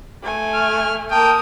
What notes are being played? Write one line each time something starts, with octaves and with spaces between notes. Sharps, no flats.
A3 G#5
F6
A#3 G5 A5 D#6